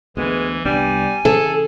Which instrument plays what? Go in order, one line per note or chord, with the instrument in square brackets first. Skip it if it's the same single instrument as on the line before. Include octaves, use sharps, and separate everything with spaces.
[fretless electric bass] D2 B3 [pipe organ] E3 [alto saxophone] G#3
[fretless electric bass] C2 B3 D4 [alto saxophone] G3 [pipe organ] G#5
[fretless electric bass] C#3 E3 [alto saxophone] G#4 [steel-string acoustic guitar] A4